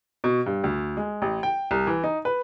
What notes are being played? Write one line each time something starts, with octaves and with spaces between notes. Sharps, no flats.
B2
G2
D2
G#3
A1
G5
C2
E3
D#4
B4